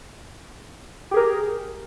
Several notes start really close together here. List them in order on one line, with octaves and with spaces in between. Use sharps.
G4 G#4 A#4